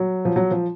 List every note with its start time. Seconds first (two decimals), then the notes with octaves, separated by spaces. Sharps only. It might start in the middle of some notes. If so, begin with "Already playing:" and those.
Already playing: F#3
0.25 F3
0.36 F#3
0.51 F3